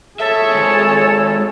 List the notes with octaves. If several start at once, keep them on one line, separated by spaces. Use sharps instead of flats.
G#4 A4 C#5 E5
D#3 G#3